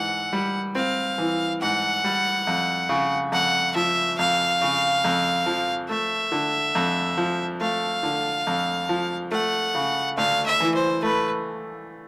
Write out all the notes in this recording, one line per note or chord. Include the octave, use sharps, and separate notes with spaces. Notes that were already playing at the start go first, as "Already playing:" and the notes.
Already playing: G#2 E3 F#5
G3
C4 F5
E3
G#2 F#5
G3
F2
C#3
F2 F#5
F3 E5
F2 F5
C#3
F2
F3
A3 E5
D3
F2
F3
A3 F5
D3
F2
F3
A3 F#5
C#3
D2 F5
E5
E3
C5
A3 B4